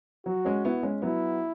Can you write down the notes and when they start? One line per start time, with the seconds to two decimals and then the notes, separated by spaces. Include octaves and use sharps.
0.26 F#3 F#4
0.45 G#3 C#4
0.65 B3 E4
0.83 G#3 C#4
1.02 F#3 B3 E4